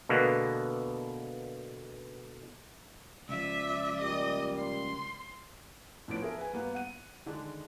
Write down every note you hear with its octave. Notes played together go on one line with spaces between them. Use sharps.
B2 D3 G#3 A#3 B3
C#2 F3 D5 E5
A#2 G3 D#5
C6
A2 F3 B3 D4 D7
G#4 A#4 E5
B4 G#5
G2 A#3 B3
F#5 D#7
D3 D#3 G#3 D4